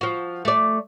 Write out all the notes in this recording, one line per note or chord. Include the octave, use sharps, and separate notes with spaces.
F3 F#4
A3 D5